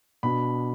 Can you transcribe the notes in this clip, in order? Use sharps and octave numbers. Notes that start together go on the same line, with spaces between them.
B2 B3 D4 B5